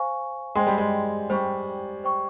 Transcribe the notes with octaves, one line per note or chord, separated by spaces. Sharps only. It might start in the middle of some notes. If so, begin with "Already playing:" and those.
Already playing: C5 F5 G#5 C#6
G#3 C5 G5 C6
G3
G#3
G3 C5 G5 C#6
C5 G5 C#6